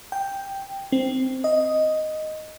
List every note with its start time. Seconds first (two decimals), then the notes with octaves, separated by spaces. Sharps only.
0.12 G5
0.92 C4
1.44 D#5